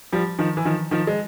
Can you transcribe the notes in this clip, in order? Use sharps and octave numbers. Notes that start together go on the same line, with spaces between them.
F3 G3
D#3 F3
E3
D#3 F3
D#3 F3
G#3